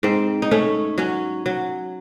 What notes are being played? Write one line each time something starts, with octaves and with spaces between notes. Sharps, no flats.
G#2 C4
D#4
A3 C#4
F#3 C#4
F#3